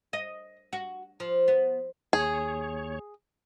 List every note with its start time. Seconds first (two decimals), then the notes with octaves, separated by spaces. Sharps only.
0.13 D#5
0.73 F#4
1.20 F3
1.48 B3
2.13 D#2 G#4 C#5